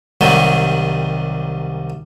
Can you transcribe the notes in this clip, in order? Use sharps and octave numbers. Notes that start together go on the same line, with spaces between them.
C2 D#3 F#3 G3